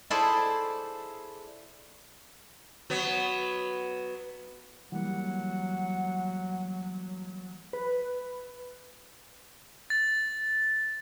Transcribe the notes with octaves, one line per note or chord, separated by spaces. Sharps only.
E4 G#4 A4 C5 D5
F#3 B3
E3 F#3 G3 A#3 F#5
B4
A6